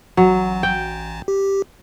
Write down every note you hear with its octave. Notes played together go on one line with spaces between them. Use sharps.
A1 F#3
G5
G4